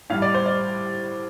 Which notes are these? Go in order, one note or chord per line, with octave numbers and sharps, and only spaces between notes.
A2 G3 F5
D5
C5
D5